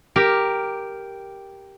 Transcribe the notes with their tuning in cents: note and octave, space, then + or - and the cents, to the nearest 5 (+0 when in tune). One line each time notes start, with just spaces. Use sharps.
G4 +0 A#4 +0